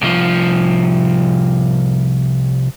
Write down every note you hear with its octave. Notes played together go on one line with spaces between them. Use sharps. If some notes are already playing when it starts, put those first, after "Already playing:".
C2 F3